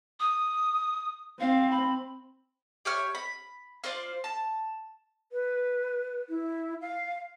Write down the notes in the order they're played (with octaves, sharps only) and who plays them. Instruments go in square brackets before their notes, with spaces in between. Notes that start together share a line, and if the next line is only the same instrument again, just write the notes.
[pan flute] D#6
[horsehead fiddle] C4 [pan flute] F5
[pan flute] B5
[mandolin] G4 C#5 E5 F6
B5
F4 C5 D5 F5
A5
[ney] B4
E4
F5